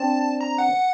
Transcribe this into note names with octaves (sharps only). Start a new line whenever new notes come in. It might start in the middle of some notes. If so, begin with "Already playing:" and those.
Already playing: C4 D4 A5
A#5
F#5